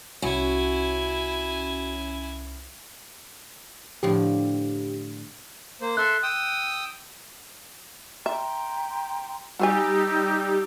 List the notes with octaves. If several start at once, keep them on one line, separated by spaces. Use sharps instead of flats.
C2 C#4 E4 F#4 G#5
A2 D3 F3 G4
A#3 C5
A4 E5 C6 F#6
G5 D#6 E6
E5 G5 A#5 C6
G3 D#4 F#4 G4 C5 G#5 E6